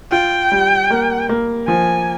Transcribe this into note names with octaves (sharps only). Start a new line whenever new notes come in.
F4 G5
G3
A#3
A#3
F3 G#5